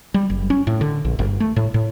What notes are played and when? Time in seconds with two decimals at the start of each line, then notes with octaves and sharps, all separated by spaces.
0.14 G3
0.30 F#1
0.50 C#4
0.67 A2
0.81 D3
1.05 A#1
1.19 G1
1.40 A3
1.56 A2
1.74 A2